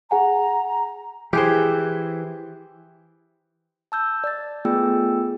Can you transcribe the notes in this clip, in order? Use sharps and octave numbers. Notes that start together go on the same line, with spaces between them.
G#4 F#5 G#5 A#5
E3 G4 G#4 C5
A5 E6 G6
D5 A6
A3 B3 F4 G#4 G5 E6